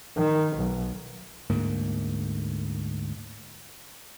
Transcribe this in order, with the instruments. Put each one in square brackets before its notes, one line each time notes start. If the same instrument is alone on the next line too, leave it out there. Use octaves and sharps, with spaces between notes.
[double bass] D#3
B1
[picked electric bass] D2 G#2 A#3